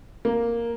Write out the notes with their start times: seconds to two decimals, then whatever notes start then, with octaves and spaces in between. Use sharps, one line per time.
0.25 A#3